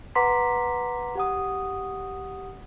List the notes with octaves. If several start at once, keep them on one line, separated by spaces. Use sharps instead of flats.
B4 F#5 A#5 C6 D6 B6
G4 F#5 D#6